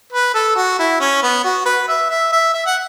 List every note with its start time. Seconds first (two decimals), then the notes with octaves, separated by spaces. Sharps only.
0.13 B4
0.34 A4
0.56 F#4
0.79 E4
1.00 C#4
1.22 B3
1.44 F#4
1.65 B4
1.88 E5
2.10 E5
2.32 E5
2.54 E5
2.66 F#5